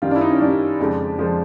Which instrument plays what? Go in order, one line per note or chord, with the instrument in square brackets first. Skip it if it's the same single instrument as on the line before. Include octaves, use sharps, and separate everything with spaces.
[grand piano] F#2 D#3 G3 F4
D4
E4
D#4
C#4
F#2 D#3 G3 D4
F2 C#3 F3 G#3
F2 C#3 F3 G#3